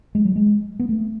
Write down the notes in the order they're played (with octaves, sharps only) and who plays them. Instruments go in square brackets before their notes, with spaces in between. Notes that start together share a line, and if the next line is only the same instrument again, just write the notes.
[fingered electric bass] G#3
F#3
G#3
B3
A3